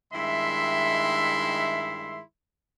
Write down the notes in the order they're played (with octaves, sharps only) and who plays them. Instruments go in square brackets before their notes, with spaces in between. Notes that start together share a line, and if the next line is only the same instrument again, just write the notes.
[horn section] G2 D#3 G#3 E4 E5 C6